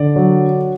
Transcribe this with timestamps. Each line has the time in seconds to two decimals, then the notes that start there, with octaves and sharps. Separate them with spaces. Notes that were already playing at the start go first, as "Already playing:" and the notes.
Already playing: D3 D5
0.16 F#3